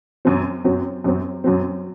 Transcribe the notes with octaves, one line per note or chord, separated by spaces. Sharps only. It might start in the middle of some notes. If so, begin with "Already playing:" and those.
F#2 F#3 C4
F#2 F#3 C4
F#2 F#3 C4
F#2 F#3 C4